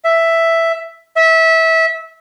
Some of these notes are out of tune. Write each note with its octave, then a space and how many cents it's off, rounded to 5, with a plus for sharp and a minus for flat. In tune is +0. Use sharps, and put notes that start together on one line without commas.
E5 +5
E5 -20